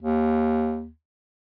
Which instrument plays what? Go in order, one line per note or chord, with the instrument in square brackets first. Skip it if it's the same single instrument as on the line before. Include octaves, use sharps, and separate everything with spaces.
[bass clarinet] D#2